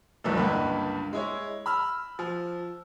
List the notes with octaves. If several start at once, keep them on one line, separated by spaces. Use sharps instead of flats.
F1 C2 F#2 E3 A3
C#2 G2 D3 A#3 B4
G#3 E4 C#5
B5 E6 F6
F3